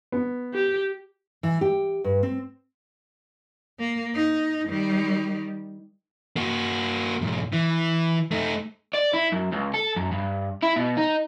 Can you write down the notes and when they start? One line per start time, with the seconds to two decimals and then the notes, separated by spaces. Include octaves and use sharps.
0.12 B3
0.54 G4
1.43 E3
1.61 G4
2.04 G2
2.23 C4
3.80 A#3
4.15 D#4
4.68 D#3 G3
6.36 A#3 F#4
7.22 B1 G#2
7.52 E3
8.31 A3 D#4
8.94 D5
9.14 E4
9.33 F#2
9.52 C#2
9.74 A4
9.96 F#2
10.12 G2
10.62 E4
10.76 B2
10.97 D#4